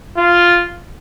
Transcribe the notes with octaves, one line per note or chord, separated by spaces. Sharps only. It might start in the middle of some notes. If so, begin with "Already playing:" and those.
F4